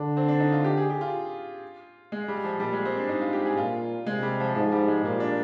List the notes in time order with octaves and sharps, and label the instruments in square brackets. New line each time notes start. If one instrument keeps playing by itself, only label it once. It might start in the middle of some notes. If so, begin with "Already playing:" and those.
Already playing: [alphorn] D3 [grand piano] D4
[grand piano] C4
D4
D#4
F4
G4
G#4
G4
F4
G#3
G3
F3
[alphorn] A#2 [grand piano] G3
[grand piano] G#3
C4
D4
[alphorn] G#2 [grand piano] D#4
[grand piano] F4
G4
G#4
[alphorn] A#2 [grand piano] F4
[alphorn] C3 [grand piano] G#3
[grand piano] G3
F3
[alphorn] G#2 [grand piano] F3
[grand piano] G3
G#3
[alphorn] A#2 [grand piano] A#3
[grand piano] D4